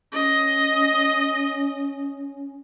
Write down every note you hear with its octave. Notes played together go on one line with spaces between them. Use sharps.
C#4 D#5